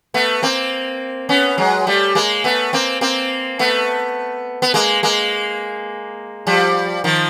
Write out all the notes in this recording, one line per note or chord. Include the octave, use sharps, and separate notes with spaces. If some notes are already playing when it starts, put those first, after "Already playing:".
A3 B3
A#3 C4
B3 C#4
F#3 G#3
G3 A3
G#3 A#3
A3 B3
A#3 C4
A#3 C4
A3 B3
B3
G#3 A#3
G#3 A#3
F3 G3
D#3 F3